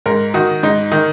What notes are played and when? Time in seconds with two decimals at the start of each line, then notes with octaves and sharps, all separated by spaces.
0.06 G#2 A#4
0.34 D#3 F#4
0.63 G#2 D#4
0.92 D#3